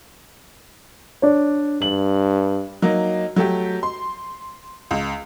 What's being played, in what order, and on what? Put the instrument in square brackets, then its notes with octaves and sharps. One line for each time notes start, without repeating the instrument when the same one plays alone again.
[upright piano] D4 C#5
[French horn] G2 [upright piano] F#7
[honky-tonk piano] F#3 A#3 D#4
F#3 A3 G4
C6
C#2